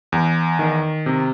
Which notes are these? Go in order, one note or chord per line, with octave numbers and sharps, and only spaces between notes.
E2
D#3
C3